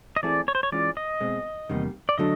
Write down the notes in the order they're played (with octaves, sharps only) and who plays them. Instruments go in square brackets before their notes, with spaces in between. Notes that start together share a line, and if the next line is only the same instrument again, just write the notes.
[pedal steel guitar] D#5
[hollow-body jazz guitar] E3 A3 C4 E4 G#4 [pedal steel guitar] D5
[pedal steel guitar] C#5
C5
C#5
[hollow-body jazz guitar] E3 G#3 C#4 F4 [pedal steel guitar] D5
[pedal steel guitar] D#5
[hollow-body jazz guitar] B2 G#3 C4
E2 C3 D#3 G3 A#3
[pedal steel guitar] D5
[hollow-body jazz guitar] D3 F#3 A3 D4 [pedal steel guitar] D#5